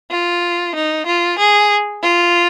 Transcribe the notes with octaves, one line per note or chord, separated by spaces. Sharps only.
F4
D#4
F4
G#4
F4